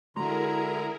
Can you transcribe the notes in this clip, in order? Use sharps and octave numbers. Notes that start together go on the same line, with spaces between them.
D3 G#3 E4 F#4 G#4 A#4 A#5 C6